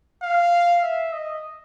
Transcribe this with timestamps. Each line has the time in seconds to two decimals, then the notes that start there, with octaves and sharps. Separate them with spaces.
0.23 F5
0.83 E5
1.13 D#5